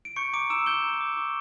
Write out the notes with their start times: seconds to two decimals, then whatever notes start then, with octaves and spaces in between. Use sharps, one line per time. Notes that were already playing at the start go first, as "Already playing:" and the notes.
0.05 D7
0.16 C#6 G6 C#7
0.33 A#5 D6 D7
0.50 A#5 E6 E7
0.66 G6 G7
0.84 A#5
1.01 D6
1.17 C#6